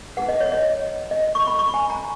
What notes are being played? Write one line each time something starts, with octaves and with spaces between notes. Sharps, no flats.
D#4 G#4 B4 F#5
D#5
C#5
D#5
D#5
C#6
B5
C#6
G#5
A#5